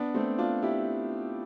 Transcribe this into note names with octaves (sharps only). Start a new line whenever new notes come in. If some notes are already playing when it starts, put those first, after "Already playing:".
Already playing: B3 D4
A3 C4
D4 F4
E4 G4